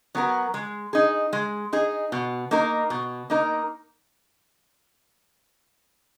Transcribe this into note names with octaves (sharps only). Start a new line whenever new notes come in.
F#3 B3 F#4 A#4
G#3
D#4 G#4
G#3
D#4 G#4
B2
A#3 D#4 A#4
B2
A#3 D#4 A#4